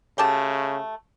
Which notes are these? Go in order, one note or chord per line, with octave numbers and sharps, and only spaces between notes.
C#3 A3 G4 A5